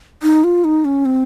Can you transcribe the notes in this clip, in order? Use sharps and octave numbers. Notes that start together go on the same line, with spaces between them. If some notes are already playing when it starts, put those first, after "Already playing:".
D#4
F4
D#4
C#4
C4